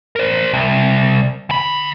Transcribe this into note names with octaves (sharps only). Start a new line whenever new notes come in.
A#4 C5
C2
D2 B5